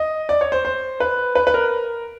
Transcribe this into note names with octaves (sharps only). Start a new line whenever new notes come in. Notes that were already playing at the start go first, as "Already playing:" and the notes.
Already playing: D#5
D5
C#5
C5
C5
B4
B4
B4
A#4